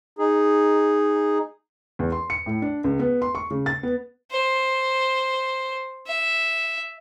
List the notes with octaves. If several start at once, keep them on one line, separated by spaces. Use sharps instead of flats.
D#4 G#4
E2
C6
C#7
A2
D4
C#2
B3
C6
C#6
C#3
A6
B3
C5
E5